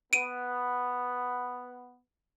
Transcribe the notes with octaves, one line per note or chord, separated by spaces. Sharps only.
B3 D7 D#7